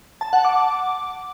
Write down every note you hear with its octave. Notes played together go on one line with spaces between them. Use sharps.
A5
F#5
D6